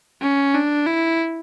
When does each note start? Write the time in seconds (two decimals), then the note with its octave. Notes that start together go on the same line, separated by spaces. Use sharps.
0.21 C#4
0.54 D4
0.87 E4